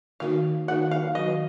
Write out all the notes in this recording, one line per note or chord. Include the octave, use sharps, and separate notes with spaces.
D#3 A#3 D#4 F#4 A#4 F5
D#3 A#3 D#4 F#4 A#4 F#5
F5
D#3 F#3 B3 F#4 B4 D#5